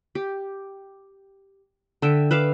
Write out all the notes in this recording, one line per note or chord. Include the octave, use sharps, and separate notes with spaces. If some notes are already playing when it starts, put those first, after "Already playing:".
G4
D3 E5 G5
B4 E5 F5 D6